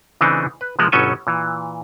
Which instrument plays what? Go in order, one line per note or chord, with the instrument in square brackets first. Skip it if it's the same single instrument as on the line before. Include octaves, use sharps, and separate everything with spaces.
[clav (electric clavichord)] C#3 E3 A3 C4 D4 D#4
B4
C3 F3 G#3 A#3 B3
G1 B2 F#3 C#4 A4 G#5
A#2 E3